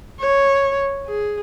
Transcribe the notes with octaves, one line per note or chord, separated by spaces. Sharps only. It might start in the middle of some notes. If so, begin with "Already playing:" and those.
C#5
G#4